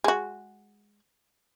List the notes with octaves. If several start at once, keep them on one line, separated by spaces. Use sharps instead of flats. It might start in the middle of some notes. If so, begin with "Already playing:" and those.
G#3 F#4